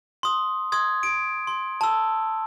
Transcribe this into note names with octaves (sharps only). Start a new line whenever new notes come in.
C6 D#6
C6 D#6 G#6
D7
C6
A5 E6